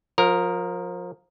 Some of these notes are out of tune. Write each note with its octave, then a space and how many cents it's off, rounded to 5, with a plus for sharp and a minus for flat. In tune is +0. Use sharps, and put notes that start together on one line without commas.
F3 +30 A#4 +0